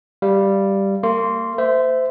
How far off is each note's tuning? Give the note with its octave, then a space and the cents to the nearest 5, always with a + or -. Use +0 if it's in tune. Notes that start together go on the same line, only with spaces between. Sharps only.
G3 +0 F5 -25
A#3 -35 C6 +0
C5 -25 E5 +0